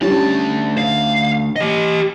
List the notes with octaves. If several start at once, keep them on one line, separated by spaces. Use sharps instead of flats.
D2 G3 C#4 D4 A5
F5
G4 D#5